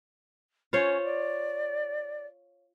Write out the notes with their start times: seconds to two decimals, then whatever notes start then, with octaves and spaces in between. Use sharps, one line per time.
0.73 C#4 F4 C5 C#5
1.04 D5